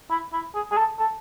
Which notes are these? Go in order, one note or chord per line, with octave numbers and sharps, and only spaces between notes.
E4
E4
G#4
G#4
A4
A4